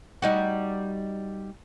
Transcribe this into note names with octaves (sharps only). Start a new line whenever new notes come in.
G3 D#4 F#4